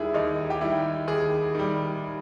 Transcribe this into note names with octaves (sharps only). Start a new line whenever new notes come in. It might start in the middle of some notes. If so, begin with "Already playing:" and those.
Already playing: D#2 D#3 G3 E4 G#4
D#2 D#4
G4
D#3 G3 E4
D#2 G#4
D#3 G3